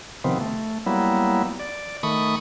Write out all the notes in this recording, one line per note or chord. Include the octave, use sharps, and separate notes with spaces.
C3 D#3 F3 B3 C4
A3
F#3 G3 A#3 B3 E4
D5
D#3 A3 B5 C#6 D#6